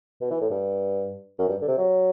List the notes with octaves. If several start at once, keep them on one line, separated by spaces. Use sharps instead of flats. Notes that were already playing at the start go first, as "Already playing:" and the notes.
B2
E3
A2
G2
F#2
G2
D3
C3
F#3